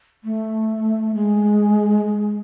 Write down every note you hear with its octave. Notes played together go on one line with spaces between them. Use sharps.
A3
G#3
G#3